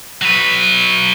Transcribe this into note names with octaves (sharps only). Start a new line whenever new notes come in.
F#3 B4